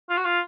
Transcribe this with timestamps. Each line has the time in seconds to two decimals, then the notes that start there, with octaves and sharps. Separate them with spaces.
0.10 F4
0.18 F#4
0.25 F4